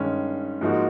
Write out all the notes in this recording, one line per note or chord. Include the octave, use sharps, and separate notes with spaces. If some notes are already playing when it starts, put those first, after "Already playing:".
Already playing: G2 D#3 G#3 C#4
G#2 F3 A#3 D#4 F#4